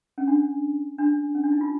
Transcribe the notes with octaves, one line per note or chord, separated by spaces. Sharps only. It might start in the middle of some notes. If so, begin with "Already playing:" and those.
C#4
D4
D4
C#4
D4
D#4
F4